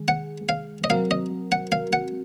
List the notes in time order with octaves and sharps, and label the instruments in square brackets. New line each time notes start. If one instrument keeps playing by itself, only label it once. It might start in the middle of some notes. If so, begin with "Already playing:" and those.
Already playing: [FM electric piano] D#3 G#3 G#4
[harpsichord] F#5
F5
D#5
[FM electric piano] F#3 C4 F#4 A#4 [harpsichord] F5
[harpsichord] D#5
F#5
F5
F#5